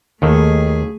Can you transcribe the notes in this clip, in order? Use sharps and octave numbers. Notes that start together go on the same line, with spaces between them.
D#2 D#3 A3 G#4 A4